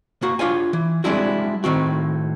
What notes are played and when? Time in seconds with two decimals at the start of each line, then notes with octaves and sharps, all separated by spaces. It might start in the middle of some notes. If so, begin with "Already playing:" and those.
0.22 A#3 F#4
0.39 D4 F4 C#5 G#5
0.73 E3
1.04 G3 G#3 C4 D4 E4 F#4
1.64 A2 D#3 C4 F#4